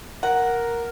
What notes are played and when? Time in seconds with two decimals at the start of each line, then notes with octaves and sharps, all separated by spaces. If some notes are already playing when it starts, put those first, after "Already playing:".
0.23 A#4 F#5